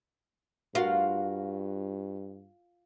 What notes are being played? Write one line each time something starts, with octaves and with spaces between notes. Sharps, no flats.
G2 F4 F#4 A#4 F5